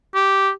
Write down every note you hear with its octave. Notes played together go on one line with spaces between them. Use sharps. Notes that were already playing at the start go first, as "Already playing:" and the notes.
G4